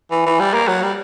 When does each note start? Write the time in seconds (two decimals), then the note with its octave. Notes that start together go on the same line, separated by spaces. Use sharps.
0.11 E3
0.26 E3
0.40 G3
0.54 A#3
0.68 F#3
0.82 G3